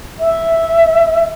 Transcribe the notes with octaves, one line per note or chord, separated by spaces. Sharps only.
E5